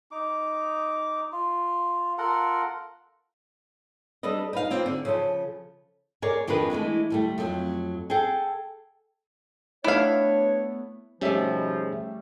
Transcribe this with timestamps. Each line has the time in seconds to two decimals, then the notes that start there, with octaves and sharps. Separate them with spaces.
0.11 D#4 D6
1.32 F4
2.18 F4 A4 A#4 F#5
4.23 G3 D4 A4 B4 D#5
4.53 D#4 B4 F5
4.70 A#3 C4 F4
4.86 D3
5.05 C#3 F3 A4
6.22 G#4 A#4 C#5 D5
6.47 F2 D#3 D4 G#4 B4
6.70 E3 G#3 A3 D4
7.10 D2 G3 A3
7.38 F2 F#3 A3
8.10 G#4 A4 F#5 G5 A5
9.84 A3 B3 D4 E4 C#5 F5
11.21 G#2 B2 F3 G3 A3 C#4 E5